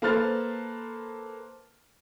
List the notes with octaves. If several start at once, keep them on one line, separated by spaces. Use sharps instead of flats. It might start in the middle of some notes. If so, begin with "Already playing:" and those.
A#3 A4 B4 C5 F6 A6